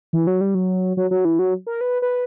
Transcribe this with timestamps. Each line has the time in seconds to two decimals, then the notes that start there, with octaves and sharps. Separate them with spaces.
0.13 E3
0.27 F#3
0.41 G3
0.55 F#3
0.97 F#3
1.11 F#3
1.25 E3
1.39 F#3
1.67 A#4
1.81 B4
2.02 B4